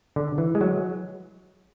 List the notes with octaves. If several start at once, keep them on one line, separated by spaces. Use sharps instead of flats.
D3
E3
G#3
F#3